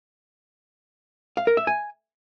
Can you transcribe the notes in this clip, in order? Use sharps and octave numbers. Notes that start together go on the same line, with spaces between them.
F5
A#4
E5
G#5